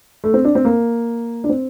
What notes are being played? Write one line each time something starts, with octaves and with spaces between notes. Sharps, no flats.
A3
C4
D4
C4
A#3
D4
C4